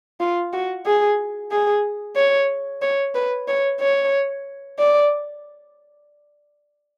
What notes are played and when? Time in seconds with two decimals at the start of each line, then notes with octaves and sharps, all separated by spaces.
0.20 F4
0.53 F#4
0.86 G#4
1.51 G#4
2.16 C#5
2.82 C#5
3.15 B4
3.48 C#5
3.80 C#5
4.79 D5